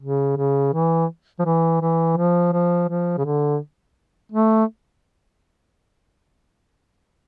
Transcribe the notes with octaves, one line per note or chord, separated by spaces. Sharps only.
C#3
C#3
E3
F3
E3
E3
F3
F3
F3
C#3
D3
A3